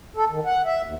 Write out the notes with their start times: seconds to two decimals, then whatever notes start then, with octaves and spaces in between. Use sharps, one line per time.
0.17 A4
0.30 D#3
0.45 F#5
0.65 E5
0.85 D#2